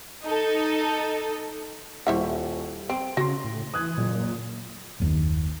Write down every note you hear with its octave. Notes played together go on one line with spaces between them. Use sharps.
D#4 A4
D#1 E4 C5 E5 F#5 C#6
C4 D7
C#3 F#4 C6 A#6
A2
E3 D#6 F#6 G#6
F#1 A#2 G#6
F#1 D#2 D#3